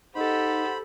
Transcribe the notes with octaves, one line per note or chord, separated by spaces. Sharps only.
D#4 G4 A4 C5 F#5 B5